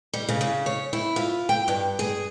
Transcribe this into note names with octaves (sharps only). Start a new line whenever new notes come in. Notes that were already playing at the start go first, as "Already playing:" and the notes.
G3
C#3
C#3
C#5
E4
F4
G5
G2
G#4